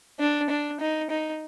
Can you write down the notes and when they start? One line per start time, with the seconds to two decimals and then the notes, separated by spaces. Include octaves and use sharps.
0.20 D4
0.50 D4
0.80 D#4
1.10 D#4